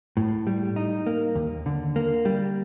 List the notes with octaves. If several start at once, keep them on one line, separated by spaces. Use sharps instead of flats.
A2
G3
D#4
A#3
D#2
D3
A#3
G3